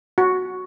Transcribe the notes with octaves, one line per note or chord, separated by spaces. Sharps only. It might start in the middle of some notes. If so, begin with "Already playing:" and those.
F#4